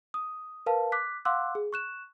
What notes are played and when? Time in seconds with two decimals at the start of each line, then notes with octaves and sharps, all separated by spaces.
0.14 D#6
0.66 A#4 B4 F5 A5
0.92 D6 F#6 B6
1.25 F5 F#5 C6 D6 E6 F#6
1.55 G#4
1.73 C#6 F#6 E7